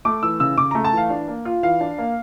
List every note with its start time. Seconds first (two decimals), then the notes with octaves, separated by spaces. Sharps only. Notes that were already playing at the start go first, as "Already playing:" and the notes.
0.05 A3 D6
0.23 E3 E6
0.40 C#3 E6
0.57 C#3 D6
0.71 A3 A#5
0.84 A5
0.93 E3 F5
1.10 D4
1.28 A#3
1.45 F4
1.63 E3 F5
1.81 D4
1.98 A#3